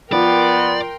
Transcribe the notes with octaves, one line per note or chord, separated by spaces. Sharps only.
F3 B3 A#4 D5 G5 C6